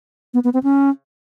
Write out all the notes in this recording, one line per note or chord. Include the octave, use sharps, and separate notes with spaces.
B3
B3
C4
C#4